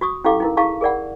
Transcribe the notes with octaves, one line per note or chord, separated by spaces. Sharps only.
F#4 C#6 D#6
C#4 E4 G4 A4 F5 D6
D#4 E4 A#4
E4 G#4 F5 A5 C#6
G#4 A#4 D5 F#5